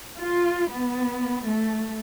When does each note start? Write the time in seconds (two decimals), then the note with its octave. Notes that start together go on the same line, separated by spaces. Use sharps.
0.20 F4
0.73 B3
1.47 A3